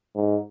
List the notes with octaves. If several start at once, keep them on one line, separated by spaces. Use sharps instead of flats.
G#2